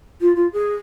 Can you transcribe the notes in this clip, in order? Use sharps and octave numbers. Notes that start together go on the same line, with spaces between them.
F4
F4
G#4